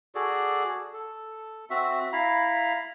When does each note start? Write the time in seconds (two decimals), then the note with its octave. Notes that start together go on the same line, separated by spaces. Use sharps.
0.15 F#4 G#4 A4 D5
0.94 A4
1.70 C4 F#4 E5
2.13 E4 F5 A#5 B5